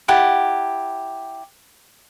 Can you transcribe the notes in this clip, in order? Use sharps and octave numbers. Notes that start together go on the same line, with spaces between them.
E4 G4 F#5 A5